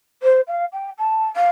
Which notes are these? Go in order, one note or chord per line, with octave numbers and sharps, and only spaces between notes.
C5
F5
G5
A5
F5